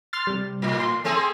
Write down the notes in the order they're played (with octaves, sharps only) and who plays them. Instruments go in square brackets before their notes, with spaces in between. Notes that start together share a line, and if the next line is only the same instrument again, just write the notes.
[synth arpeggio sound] C6 F6 A6
C3 G3
[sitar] A2
[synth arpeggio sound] C6
[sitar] A3 C4 G#4